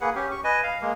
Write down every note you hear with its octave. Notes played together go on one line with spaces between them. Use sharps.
A#3 G#4 B4 F#5
C#4 G4
C#6
B4 D#5 G#5
F5
G#3 A#3